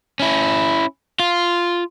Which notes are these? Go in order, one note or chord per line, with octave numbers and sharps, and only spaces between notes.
C#4 E4
F4